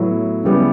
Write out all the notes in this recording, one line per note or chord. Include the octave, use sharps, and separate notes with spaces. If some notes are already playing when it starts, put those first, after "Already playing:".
Already playing: A2 F#3 B3 E4
C#3 G3 B3 E4